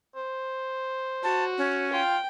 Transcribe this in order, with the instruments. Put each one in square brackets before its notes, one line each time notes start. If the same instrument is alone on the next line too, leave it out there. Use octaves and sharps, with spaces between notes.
[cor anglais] C5
[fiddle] F#4 [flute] A5
[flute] C#4
[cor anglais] F4 [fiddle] G5